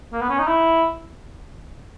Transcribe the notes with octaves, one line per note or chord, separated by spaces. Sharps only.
A#3
B3
C#4
D#4
E4